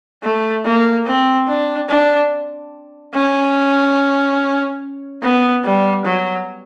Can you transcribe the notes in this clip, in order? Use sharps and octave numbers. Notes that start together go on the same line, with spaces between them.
A3
A#3
C4
D4
D4
C#4
B3
G3
F#3